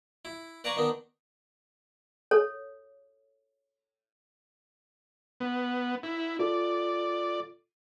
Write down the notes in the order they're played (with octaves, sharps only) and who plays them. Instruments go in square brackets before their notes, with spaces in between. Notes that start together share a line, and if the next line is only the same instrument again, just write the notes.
[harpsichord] E4
B4 D5 F5 G#5 A#5 C#6
D#3 B3 D4 D#4
[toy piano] A4 C#5
[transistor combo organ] B3
E4
[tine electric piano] F4 A4 [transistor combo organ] D5